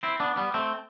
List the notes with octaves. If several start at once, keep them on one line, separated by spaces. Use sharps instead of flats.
C4 E4
B3 D4
G3 B3
A3 C4